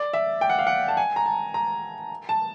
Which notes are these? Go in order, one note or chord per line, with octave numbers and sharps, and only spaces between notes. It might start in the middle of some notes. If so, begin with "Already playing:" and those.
Already playing: D5
E5
G5
F#5
F5
F#5
A5
G#5
A#5
A5
A#5
A5